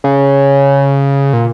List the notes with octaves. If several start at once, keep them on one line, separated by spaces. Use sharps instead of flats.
C#3
A#2